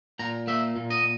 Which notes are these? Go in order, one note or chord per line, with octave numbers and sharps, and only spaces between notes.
A#2 A#5
A#3 E5
A#2
D#5